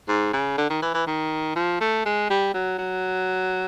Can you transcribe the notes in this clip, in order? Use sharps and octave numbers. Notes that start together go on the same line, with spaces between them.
G#2
C#3
D3
D#3
E3
E3
D#3
F3
A3
G#3
G3
F#3
F#3